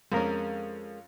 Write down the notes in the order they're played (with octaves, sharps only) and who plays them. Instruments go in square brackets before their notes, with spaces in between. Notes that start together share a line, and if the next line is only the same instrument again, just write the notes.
[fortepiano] F2 C#4 [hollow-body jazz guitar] G#3 A#4